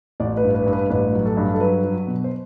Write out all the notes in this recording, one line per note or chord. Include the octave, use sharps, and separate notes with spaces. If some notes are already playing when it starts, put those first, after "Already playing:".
A1 D5
B4
G2
B4
G2
B4
A1 B4
F#3
A4
G2
A4
F#3 B4
F#3
B2
C5